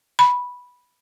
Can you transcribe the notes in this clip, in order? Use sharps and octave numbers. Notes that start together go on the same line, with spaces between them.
B5